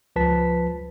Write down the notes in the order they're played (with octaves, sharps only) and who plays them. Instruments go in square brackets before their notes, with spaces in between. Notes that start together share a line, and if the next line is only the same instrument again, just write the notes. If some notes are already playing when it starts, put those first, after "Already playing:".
[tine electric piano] C#2 F3 B4 A5 B6